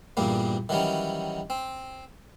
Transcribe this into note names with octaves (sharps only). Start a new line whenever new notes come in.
E2 G2 A#2 G3 A#3
D#3 E3 F#3 G3 C#4
C4